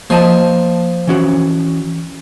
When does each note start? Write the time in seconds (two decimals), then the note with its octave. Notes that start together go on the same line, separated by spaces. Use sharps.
0.10 F3 A#3 D#5 A5
1.07 E3 C#4 F#4